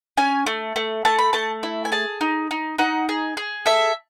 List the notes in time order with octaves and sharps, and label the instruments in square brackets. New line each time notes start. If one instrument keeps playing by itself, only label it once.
[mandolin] C#4 G#5
A3
A3
A3 A5
B5
A3 A5
E4
G#5
G#4 A5
D#4
D#4
D#4 F#5
G#4
G#4
A4 E5